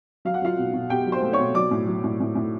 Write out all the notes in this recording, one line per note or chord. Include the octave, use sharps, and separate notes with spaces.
F#3 F5
F#5
F#3 F4 F5
B2
B2
B2 G4 G5
F#3
C5 C6
A3
C#5 C#6
B2
F#3 D5 D6
A2
F#3
A2
A2
A2